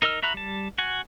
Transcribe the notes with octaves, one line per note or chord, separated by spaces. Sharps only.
D#4 A#4 D#5 E6 F6
F#4 E5 A#5 B5 F#6
G3 A5
F#4 F#5 G#5